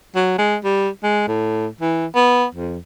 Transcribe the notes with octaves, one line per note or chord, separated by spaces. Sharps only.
F#3
G#3
G3
G#3
A2
E3
B3
F2